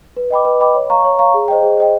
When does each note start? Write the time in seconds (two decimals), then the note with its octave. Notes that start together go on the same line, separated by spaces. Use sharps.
0.17 B4
0.30 D#5 G5 B5 D6
0.45 B4
0.60 D#5 G5 B5 D6
0.75 C#5
0.90 F5 A#5 C#6
1.04 C#5
1.19 F5 A#5 C#6
1.34 G#4
1.48 C5 D#5 G5
1.63 G#4
1.78 C5 D#5 G5